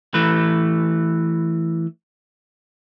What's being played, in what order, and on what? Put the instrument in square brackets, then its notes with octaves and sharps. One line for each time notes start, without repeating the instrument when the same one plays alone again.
[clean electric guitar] E3 A3 B4